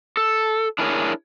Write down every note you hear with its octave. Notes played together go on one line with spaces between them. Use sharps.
A4
D4 E4 G#4 A#4 C5 C#5